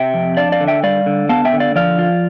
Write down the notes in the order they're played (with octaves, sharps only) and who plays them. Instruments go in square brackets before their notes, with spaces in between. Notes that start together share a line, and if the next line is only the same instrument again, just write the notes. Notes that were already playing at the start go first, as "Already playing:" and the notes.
Already playing: [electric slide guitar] C3 E5 G5
F2
D4 D5 F5
D5 F5
D3
E5 G5
G3 D5 F5
D3
B3 F5 A5
E5 G5
D3
D5 F5
F3 D5 F5
F4